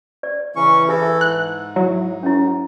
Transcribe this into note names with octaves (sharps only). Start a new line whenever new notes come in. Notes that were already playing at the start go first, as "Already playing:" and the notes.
D5
C#3 E3 C#4 C#6
E4 G#4 A4 E5
G#2 F#6
F#3 E4
F#2 C#4 E4